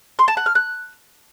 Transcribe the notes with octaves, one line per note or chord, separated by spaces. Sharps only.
C6
A5
F#5
F6
F#6